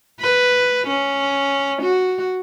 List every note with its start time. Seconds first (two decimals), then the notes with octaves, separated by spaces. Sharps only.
0.20 B4
0.87 C#4
1.82 F#4